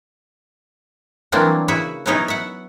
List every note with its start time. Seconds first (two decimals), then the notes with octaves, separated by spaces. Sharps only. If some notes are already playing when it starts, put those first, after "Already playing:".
1.32 E3 F#3 G3 A#3 C4 D4
1.68 C#3 E4 F#4 E5
2.06 F#3 B3 C#4 D#4 E4
2.28 E5 F#5